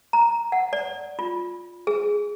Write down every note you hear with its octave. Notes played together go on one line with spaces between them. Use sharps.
A#5
F#5
D5
F4
G#4